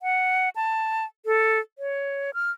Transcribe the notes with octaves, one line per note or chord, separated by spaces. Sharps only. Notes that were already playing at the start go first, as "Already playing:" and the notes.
F#5
A5
A4
C#5
F6